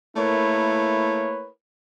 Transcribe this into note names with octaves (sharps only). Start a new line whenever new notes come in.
A3 A#3 E4 A#4 B4 C#5